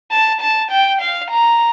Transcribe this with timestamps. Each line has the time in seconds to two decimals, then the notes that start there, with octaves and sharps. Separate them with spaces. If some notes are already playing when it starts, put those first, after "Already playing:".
0.11 A5
0.41 A5
0.71 G5
1.01 F5
1.31 A#5